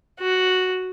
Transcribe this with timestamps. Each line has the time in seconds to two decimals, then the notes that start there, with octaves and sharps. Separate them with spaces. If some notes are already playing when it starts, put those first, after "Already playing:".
0.20 F#4